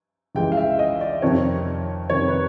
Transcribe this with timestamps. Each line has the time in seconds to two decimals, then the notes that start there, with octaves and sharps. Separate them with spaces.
0.35 C#2 C#3 E3 G#3 G5
0.52 F5
0.57 E5
0.79 D#5
1.01 D5
1.22 F2 C3 D#3 C#5
2.10 F2 C3 D#3 C#5
2.28 B4